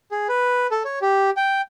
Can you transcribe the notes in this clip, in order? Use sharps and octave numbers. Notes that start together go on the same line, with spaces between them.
G#4
B4
A4
C#5
G4
G5